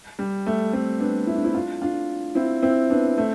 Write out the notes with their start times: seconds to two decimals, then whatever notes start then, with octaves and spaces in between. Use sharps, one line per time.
0.19 G3
0.47 A3
0.73 A3 C4
1.00 B3 D4
1.27 E4
1.35 D4
1.44 C4 E4
1.55 D4 F4
1.82 D4 F4
2.35 C4 E4
2.62 C4 E4
2.90 B3 D4
3.17 A3 C4